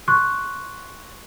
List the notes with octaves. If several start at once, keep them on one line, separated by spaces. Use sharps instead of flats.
C6 C#6 F#6